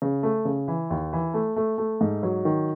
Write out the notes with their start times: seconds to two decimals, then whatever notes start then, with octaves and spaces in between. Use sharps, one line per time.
0.02 C#3
0.23 A3
0.45 C#3
0.68 E3
0.90 D#2
1.13 E3
1.34 A3
1.56 A3
1.78 A3
2.01 G#2
2.23 F#3
2.45 D#3